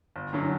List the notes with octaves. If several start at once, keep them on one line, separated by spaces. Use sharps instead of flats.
G1
F#2 D3 F#3